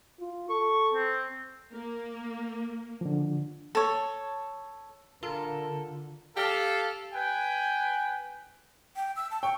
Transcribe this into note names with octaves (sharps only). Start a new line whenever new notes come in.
F4
A4 C#6
C4
A#3
D3 F3
A4 C#5
D3 F4 A4 A#4
G4 A4 F5
B4 G5 G#5
G5
E6
A5
G5 C#6